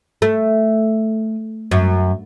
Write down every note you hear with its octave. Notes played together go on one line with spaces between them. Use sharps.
A3
F#2